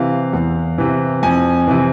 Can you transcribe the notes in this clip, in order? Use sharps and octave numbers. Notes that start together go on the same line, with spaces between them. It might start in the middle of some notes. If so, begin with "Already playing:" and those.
Already playing: C3 E3 F5
E2
C3 E3
F2 G#5
C3 E3